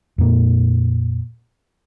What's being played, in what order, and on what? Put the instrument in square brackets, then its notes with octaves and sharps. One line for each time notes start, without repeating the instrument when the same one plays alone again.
[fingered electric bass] F2 A#2 A#3